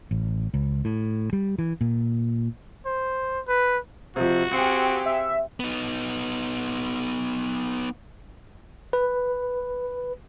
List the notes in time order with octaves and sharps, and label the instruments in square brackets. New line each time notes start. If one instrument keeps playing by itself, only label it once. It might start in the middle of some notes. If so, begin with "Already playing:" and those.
[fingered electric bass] A1
C#2
A2
G3
E3
A#2
[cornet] C5
B4
[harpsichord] F2 C3 [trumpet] F#4
[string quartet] C4 G4 G#4 [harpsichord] F5 F#5
[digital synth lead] E5
[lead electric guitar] B3 D#4
[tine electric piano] B4